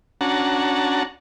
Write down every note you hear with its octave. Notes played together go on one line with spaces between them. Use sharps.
C#4 D4 F#4 F#5 A5 A#5